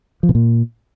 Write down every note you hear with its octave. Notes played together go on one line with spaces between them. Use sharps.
F3
B2
A#2